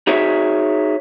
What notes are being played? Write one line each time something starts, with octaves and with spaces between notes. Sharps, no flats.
D#4 F#4 G#4 C#5 E5